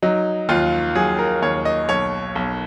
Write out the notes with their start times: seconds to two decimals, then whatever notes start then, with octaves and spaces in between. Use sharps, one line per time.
0.02 F#3 D#4
0.49 D#2 F4
0.95 F#3 G#4
1.19 A#4
1.42 D#2 C#5
1.65 D#5
1.89 B1 C#5
2.35 B1